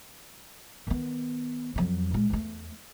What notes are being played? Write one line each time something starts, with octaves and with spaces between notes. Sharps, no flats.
D#3 B3
F2 F#3
A#2 G#3
E2 A3